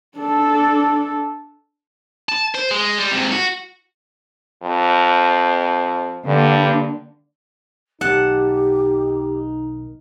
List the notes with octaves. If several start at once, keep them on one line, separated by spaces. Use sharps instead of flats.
D4 A4
A5
C5
G#3
G3
G#2 C3
F#4
F2
G2 D3 A#3
B1 D#3 D#4 G4 F#5 A5